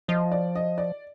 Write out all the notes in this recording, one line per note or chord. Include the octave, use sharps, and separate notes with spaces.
F3 D#5
D5
D#5
D5